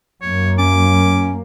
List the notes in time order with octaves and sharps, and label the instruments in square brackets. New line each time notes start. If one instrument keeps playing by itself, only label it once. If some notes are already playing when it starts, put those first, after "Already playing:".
[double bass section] F#2 A#3 [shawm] C#5
[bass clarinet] C#4 [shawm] D6